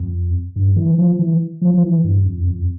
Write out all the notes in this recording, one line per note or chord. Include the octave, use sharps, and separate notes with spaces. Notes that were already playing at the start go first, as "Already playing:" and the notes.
Already playing: F2
G2
E3
F3
E3
F3
F3
E3
G2
F2
F2